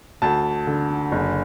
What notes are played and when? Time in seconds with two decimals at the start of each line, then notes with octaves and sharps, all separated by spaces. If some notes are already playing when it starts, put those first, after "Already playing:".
0.22 D2 A5
0.67 D3
1.12 F#1